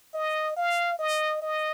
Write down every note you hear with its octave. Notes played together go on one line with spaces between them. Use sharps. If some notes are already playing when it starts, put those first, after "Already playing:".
D#5
F5
D#5
D#5